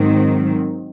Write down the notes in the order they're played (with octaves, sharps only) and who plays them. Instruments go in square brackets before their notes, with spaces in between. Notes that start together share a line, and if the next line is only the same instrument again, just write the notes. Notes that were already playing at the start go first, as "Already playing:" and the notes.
Already playing: [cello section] G#2 D#3 F#3 C4